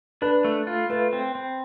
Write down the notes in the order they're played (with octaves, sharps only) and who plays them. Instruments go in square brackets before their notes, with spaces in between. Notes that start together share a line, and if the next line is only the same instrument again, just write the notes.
[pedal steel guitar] D4 [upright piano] B4
[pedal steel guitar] A3
F4
[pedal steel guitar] A3 [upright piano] B4
[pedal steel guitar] C4
C4